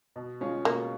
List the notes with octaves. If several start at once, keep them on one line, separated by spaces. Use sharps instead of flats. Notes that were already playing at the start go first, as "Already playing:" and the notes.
B2
G#3 C#4 F4 G#4
B2 A#3